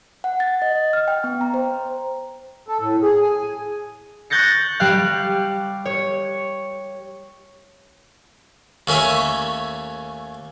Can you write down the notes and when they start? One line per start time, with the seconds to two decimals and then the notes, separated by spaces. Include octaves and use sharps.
0.24 F#5
0.40 A6
0.62 D#5
0.75 D#5
0.93 F6
1.08 G5
1.24 B3
1.41 A#5
1.54 C5
2.68 A4
2.81 A2
3.03 G#4
3.21 G#5
4.30 C#6 F#6 G6 A6 A#6 C#7
4.80 G3 G4 F5 F#6
5.86 C#5
8.87 D#2 A3 C#4 C#5 E5